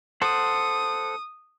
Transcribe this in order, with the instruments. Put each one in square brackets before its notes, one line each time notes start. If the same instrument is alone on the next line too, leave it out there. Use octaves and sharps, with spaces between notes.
[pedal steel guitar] A4 C5 F#5 [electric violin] D#6